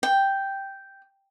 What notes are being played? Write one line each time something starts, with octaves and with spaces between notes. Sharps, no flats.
G5